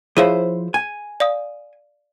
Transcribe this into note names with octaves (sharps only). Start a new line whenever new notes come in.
F3 E4 G#4 C5 C#5 F5
G#5
D5 F5 D#6